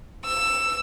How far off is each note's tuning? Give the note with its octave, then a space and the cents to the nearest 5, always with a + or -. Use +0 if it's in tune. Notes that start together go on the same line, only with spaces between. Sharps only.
E6 +10